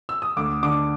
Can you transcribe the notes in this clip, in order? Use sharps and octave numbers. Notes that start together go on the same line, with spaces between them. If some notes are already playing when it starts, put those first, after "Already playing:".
E6
D#6
D2 D6
D3 D6